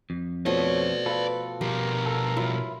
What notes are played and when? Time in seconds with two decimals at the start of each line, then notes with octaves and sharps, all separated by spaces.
0.10 F2
0.46 B2 F3 A3 C#5 D5 E5
1.06 F4 A4 B4
1.61 B2 F3 G4 A#4
2.06 A4
2.37 F#3 E4 F4